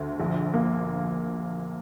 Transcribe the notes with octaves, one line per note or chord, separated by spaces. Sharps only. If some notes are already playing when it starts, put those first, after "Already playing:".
Already playing: D2
A#1
A#3